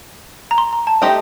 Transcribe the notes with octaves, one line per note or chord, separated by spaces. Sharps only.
A#5
C6
A#5
A5
A3 D#4 G4 C5 D#5 G5